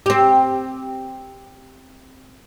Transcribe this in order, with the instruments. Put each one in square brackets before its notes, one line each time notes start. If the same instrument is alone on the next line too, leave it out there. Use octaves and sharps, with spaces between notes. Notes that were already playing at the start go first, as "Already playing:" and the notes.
[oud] C4 G4